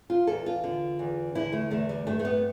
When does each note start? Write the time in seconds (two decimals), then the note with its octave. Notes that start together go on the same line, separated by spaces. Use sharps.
0.10 F4
0.27 E2 A4
0.46 F4
0.64 D3
0.99 E2
1.35 D3 E4
1.52 A3
1.71 E2 A3
1.89 G3
2.07 G2 A3
2.19 A3
2.25 B3